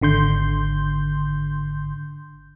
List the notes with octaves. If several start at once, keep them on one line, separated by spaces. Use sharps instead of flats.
G#1 D3 C6 G6